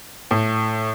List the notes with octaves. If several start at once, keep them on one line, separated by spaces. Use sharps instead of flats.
A2